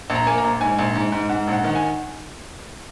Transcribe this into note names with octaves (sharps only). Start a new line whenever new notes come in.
A#1
A#5
A#3 G#5
A#5
A#1
G#2 G#5
A#1
G#2
G#2
G#2 F#5
A#1 F#5
D#3 F#5
G#5